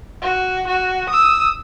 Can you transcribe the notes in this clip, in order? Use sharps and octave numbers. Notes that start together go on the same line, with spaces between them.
F#4
F#4
D#6 E6